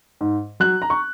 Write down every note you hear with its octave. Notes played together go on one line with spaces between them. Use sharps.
G#2
F#3 F#6
A#5
C#6